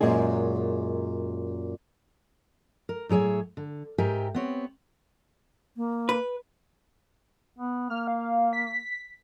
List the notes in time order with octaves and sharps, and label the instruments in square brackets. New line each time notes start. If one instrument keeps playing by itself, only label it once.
[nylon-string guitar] F#2 A#2 G#3 G#4
[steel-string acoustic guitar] A#4
A2 F#3 G#4 C#5 E5
D3
G#2 G4 A#4 E5 G5 G#5
B3 C4 C#5
[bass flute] A#3
[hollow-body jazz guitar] B4
[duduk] B3
[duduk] A#3 [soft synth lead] F6
[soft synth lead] F5
B6